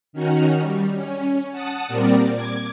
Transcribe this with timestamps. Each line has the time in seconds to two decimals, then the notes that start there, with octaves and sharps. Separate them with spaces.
0.13 D#3 C#4 D#4 F#4 F6
0.60 G3
0.94 C#4
1.51 F#5 A5 D#6
1.87 A#2 G3 C4 A#4 D5
2.32 D6 G#6